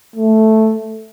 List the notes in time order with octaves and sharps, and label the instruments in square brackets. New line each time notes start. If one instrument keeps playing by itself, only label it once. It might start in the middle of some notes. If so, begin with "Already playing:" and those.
[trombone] A3